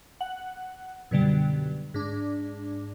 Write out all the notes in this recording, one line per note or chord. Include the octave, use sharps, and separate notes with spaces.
F#5
F#2 B2 D3 G3
G#2 D4